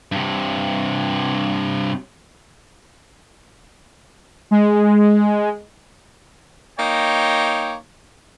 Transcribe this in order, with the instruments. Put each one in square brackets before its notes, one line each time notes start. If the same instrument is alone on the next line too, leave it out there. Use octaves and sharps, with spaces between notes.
[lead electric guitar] G2 C3
[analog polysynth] G#3
[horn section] A#3 D#4 C#5 G5